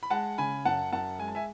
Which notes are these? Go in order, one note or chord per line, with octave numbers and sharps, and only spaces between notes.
B5
G#3 F#5 A5
C#3 G#5 B5
F#2 F#5 A5
F#2 F#5 A5
G#3 G#5
A5
E5 G#5